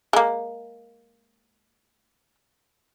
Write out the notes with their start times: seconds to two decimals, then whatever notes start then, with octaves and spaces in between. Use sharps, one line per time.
0.13 G#3 A#3